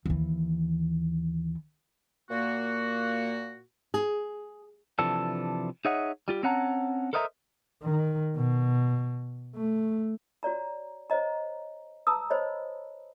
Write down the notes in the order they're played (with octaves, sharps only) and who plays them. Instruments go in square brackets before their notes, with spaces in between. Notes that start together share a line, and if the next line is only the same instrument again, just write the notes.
[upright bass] D#2 E3
[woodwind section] A#2 A#3 F#4
[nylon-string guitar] G#4
[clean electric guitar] C3 E3 F3 D4 A4
D#4 G#4 C#5 D#5 E5 F#5
G3 F4 G4
C4 C#4 C#5 F#5 A5 A#5
A4 A#4 C5 D#5 E5 A#5
[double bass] D#3
B2
A3
[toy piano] F#4 C#5 D5 A#5
C5 C#5 D#5 A#5
B4 A5 A#5 D#6 E6
C5 C#5 D#5 B5